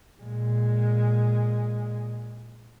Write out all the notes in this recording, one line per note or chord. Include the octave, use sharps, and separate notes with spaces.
A#2 G#3